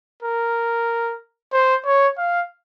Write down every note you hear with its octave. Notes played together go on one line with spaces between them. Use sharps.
A#4
C5
C#5
F5